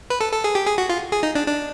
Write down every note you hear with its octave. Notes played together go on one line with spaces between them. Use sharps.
B4
A4
A4
G#4
G4
G#4
F#4
F4
G#4
D#4
D4
D4